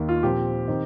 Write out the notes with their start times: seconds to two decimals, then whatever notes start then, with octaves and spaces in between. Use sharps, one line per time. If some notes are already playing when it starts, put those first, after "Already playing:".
Already playing: D#2 D#3
0.09 F4
0.23 A#2 F3 C4 G4
0.68 D#3 C4